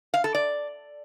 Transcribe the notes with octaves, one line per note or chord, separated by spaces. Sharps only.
F5
A4
D5